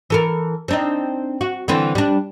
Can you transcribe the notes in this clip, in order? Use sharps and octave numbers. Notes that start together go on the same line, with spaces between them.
E3 A4 A#4
C4 D4 D#4
F#4
D3 E3 C4
G3 D4